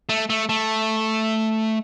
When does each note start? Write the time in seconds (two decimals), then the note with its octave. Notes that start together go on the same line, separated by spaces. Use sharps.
0.09 A3
0.30 A3
0.49 A3